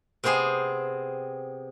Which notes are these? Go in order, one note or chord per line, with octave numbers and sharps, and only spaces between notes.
C3 B3 C4 G#4 C5